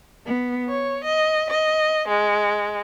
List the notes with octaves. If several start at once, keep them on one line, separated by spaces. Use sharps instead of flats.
B3
C#5
D#5
D#5
G#3